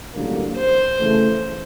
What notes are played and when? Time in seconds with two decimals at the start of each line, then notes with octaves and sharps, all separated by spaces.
0.13 A1 G2 D3 F#3 A#3
0.56 C5
0.98 C#3 E3 A3